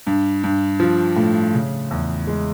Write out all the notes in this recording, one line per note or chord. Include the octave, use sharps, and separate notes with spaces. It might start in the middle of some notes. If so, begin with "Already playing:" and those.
G2
G2
F3
A2
C#3
E2
G#3